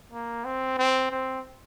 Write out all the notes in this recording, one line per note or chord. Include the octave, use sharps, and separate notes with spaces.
A#3
C4
C4
C4